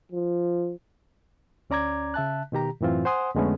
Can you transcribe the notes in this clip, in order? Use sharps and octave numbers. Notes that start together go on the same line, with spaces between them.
F3
D2 C#4 D5 A#5 D6 G#6
C#3 E5 A5 F#6
B2 D#3 G4 A#5
F#2 A2 E3 C4 F4
C5 F#5 G#5 C6 D#6
F2 D3 G#3 A3 B3 C#4